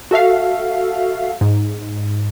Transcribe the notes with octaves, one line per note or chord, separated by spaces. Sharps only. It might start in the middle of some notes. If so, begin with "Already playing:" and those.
F#4 A4 E5 F5
G#2